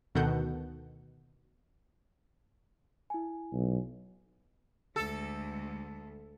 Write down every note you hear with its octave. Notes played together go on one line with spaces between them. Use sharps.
D2 B2 D#3 A4 F#5 G6
E4 G#5
B1
D2 G#3 A4